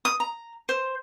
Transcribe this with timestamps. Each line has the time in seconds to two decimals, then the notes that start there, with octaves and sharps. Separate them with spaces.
0.05 D#6
0.20 A#5
0.69 C5